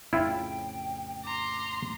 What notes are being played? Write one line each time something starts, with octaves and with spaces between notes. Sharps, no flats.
F2 A2 C#3 E4 F4 G5
A#5 C6 D6